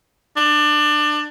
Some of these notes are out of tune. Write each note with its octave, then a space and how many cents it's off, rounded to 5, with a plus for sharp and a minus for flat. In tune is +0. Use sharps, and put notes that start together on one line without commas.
D4 +25